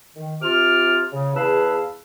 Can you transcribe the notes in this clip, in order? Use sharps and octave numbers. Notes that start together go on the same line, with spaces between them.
D#3
C3 F4 D6 F6
C#3
E2 G#4 B4 F5 A5 E6